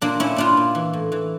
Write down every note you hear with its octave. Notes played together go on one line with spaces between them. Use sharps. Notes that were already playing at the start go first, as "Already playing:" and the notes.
A#2 A#3 D4
A#2 C#4 E4
A#2 D4 F4
A#2
E3
A2
E3